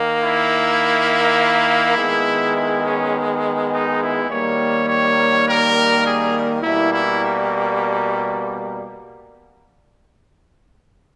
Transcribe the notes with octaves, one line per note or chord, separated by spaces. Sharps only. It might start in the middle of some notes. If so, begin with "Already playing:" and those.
Already playing: D#3 A#3
E4
D#3 G#3 B3
E4
C#4
D#4
E4
D#3 G3 A#3 C#5
C#5
A#4
G#4
B2 G3 A#3 E4
E4